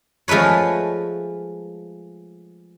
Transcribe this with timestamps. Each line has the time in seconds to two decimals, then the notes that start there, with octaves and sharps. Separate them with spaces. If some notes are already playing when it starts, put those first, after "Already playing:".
0.28 F3 G#3 A3 B4 C#5